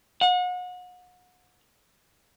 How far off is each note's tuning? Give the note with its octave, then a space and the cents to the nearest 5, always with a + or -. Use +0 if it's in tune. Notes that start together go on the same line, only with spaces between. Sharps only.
F#5 -35